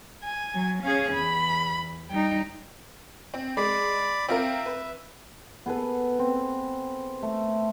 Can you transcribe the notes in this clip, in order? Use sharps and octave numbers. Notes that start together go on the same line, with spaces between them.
G#5
F#3
C#4 G#4 F5
E2 B5
G3 D#4 G5
C4
G#3 D5 B5
C4 F4 A#4 E5
B4
B3 G#4 A4 B4
C4
A3